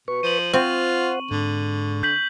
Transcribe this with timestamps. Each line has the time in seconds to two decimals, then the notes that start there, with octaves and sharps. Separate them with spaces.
0.08 B2 B4 C#6
0.23 F3 D#7 F#7
0.53 C4 F4 C5 F#5 C#6
1.31 G#2 D3
2.03 G6 B6 F#7